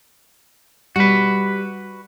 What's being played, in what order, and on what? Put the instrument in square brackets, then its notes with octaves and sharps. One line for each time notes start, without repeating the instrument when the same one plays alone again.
[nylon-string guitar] G3 [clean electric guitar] F#4 B4